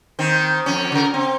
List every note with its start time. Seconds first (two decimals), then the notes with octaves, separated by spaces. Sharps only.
0.19 D#3 C4
0.66 F2 C#4
0.92 C#3 A#4
1.14 C4